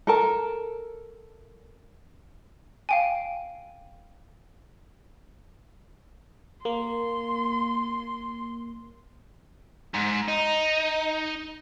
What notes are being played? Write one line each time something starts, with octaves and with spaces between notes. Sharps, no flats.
A4 A#4 A5
F5 G5 G#5
A#3 C6
G#2
D#4